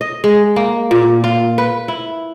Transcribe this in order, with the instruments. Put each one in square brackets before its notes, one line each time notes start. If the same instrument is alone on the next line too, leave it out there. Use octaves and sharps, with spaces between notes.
[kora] D#5
G#3
A#3
A#2
F4
B4
E4